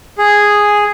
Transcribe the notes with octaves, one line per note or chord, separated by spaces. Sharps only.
G#4